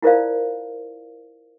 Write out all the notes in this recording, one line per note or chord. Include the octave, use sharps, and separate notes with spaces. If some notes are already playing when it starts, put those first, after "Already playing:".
E4 F4 A#4 C5 D5 F5